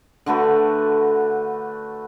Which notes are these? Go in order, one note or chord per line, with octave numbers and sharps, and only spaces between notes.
D3 A3 F#4 B4